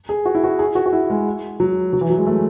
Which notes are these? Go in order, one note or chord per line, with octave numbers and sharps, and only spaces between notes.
G#4
F#4
E4
F#4
G#4
F#4
F#4
E4
G#3
F#3
F#3
E3
F#3
G#3
A3